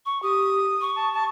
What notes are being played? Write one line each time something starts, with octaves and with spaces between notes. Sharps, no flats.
C#6
G4 D#6
C#6
A5
A5